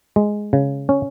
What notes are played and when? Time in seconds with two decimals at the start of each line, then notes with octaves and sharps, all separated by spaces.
0.16 G#3
0.53 C#3
0.89 C#4